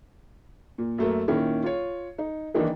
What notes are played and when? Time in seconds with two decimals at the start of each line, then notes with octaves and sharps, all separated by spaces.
0.78 A#2
0.98 F#2 A3 A#3
1.28 A#2 D#3 C#4 E4
1.64 F4 C#5
2.18 D#4
2.54 D#3 E3 A#3 D4 D#4